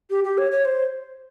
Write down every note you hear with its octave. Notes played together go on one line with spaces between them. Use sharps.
G4
G4
C#5
C#5
C5